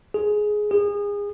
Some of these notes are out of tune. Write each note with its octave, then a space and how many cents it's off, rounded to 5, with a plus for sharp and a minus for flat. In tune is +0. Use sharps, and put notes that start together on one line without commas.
G#4 +10
G#4 -30